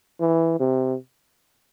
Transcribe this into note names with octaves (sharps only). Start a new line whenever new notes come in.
E3
C3